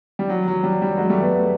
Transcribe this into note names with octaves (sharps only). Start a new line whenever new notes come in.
G3
F#3
F#3
G3
G3
F#3 G#3
G3 A3
A3 B3